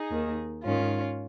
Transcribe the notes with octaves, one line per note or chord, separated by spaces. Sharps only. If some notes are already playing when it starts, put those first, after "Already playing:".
Already playing: D#4 G#4
D#2 D#3
G#2 D#3 C#4 F4